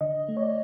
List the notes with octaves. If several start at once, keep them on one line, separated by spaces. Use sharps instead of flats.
D3 D#5
A3
C#5
D5